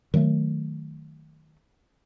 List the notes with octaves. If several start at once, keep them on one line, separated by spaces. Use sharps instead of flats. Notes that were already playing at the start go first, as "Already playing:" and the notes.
D#3 F#3 G#3 A3